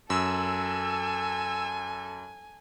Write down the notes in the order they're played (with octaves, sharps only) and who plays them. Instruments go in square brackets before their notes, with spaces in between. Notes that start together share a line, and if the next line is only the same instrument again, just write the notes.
[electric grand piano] F#2 [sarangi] A4 [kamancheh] G#5 [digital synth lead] E6